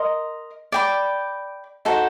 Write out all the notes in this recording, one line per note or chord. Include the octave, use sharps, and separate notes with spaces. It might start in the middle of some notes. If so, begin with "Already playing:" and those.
Already playing: A#4 D#5 C6
D5 G5 B5
D#4 F#4 A4 C5